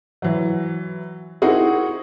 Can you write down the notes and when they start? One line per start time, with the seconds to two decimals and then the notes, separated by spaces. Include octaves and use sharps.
0.22 E3 F#3
1.42 C4 D#4 E4 F#4 G#4 A#4